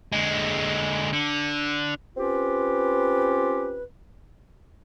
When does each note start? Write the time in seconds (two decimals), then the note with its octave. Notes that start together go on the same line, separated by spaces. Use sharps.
0.12 D3 G#3
1.13 D3
2.16 C4 C#4 F4 G4 B4